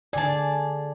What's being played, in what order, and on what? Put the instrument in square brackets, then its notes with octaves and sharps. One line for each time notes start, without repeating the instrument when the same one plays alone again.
[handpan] D3 D5 [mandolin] G#4 A5